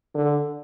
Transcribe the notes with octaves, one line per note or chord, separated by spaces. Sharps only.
D3